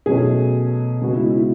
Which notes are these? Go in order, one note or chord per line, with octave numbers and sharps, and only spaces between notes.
B2 F#3 A3 C#4 G#4
C#3 G#3 B3 F#4
E4
E4